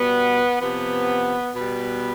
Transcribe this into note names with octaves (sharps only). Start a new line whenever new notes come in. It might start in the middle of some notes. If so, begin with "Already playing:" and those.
Already playing: B2 G3 B3
C3 F3 B3
B2 G3 B3